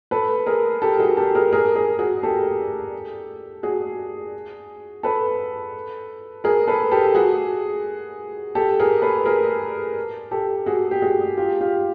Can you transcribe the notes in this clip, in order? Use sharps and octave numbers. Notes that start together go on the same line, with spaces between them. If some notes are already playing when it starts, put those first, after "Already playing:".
A4 B4
G#4 A#4
G4 A4
F#4 G#4
G4 A4
G#4 A#4
G#4 A#4
G#4 A#4
F#4 G#4
G4 A4
F#4 G#4
A4 B4
G#4 A#4
A4 B4
G4 A4
F#4 G#4
G4 A4
G#4 A#4
A4 B4
G#4 A#4
G4 A4
F#4 G#4
G4
F#4 G#4
F4 G4
F4 G4